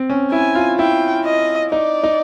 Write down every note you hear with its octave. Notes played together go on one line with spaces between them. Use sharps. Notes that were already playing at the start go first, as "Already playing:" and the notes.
Already playing: C4
C#4
E4 G#5
F4
E4 G5
D#5
D#4 D5
D#4